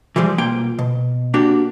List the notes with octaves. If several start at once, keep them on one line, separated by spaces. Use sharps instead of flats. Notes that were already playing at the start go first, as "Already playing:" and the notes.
E3 F3 G3 G#3
B1 A#3 F4 G5
B2
A#3 D4 F#4 G4